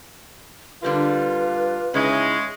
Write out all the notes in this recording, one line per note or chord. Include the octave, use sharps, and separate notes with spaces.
D3 G3 A#3 F4 B4
C#3 G#3 C#4 D#4 E4